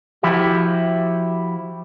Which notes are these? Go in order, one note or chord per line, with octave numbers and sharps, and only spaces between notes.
F3 E4 F#4 G4 E5